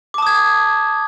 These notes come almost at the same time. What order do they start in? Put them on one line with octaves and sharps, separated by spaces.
D6 A5 D#6 G#6